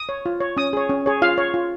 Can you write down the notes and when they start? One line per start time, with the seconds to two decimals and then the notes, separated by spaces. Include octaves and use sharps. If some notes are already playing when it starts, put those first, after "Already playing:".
Already playing: D#6
0.09 C#5
0.26 F4
0.40 C#5
0.57 C#4 D#6
0.73 G#4 C#5
0.90 C#4
1.06 G#4 C#5
1.22 F4 F5
1.38 C#5
1.54 F4